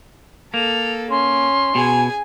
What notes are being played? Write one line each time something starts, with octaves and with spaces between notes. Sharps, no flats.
A#3 A4 F7
C#4 C6
B2 G#4 G#5